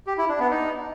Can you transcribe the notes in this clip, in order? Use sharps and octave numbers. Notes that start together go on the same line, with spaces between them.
G4
E4
D4
B3
D#4